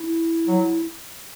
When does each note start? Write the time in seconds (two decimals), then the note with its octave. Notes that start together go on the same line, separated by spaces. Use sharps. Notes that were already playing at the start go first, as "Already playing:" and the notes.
Already playing: E4
0.47 F#3